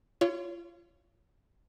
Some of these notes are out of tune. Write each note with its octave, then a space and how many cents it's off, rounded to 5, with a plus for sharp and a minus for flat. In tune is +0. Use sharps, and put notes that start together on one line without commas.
F4 -30 C#5 +15